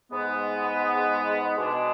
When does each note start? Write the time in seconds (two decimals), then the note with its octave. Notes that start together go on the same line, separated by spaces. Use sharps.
0.10 G#2 G#3 B3
1.55 B2 G#3 D4